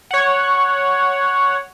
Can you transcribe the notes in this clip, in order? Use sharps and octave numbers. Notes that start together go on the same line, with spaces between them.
C#5 F#5